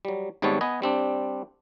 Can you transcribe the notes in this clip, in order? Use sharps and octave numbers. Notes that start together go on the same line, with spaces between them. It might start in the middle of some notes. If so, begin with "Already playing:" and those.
F#3 G3
G#1 G#2 G3 B3 C#5 A5
B3 B4 D#5 G#5
G3 C4 D4